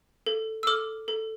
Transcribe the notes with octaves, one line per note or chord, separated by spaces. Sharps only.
A4
E6
A4 D6 F6
A4